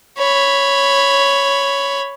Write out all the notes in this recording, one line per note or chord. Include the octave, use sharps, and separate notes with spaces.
C#5 B5